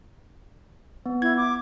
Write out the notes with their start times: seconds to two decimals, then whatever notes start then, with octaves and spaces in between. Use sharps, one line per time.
1.06 B3
1.22 E4 G#6
1.37 D6